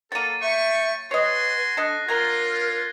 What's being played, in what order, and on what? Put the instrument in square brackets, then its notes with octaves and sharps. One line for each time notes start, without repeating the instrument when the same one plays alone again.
[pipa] F#3 A#3 [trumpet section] A4 [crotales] A6 D#7
[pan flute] E5 [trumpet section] G5 C#6
[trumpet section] F#4 G#5 C6 [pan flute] B4 [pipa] C#5 D#5
[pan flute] D4 [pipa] A4 D#5 [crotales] F#6 A#6 C7
[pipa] F#3 A#5 [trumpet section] D4 F4 [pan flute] A#4 [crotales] G#6 A#6 G7